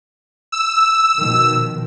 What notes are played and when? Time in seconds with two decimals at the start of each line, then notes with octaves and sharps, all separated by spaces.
0.52 E6
1.17 B2 D#3 F3